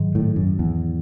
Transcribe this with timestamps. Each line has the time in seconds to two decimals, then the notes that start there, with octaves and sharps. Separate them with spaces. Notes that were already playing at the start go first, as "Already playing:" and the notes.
Already playing: G#2 D#3 F#3
0.15 A2
0.36 F#2
0.59 E2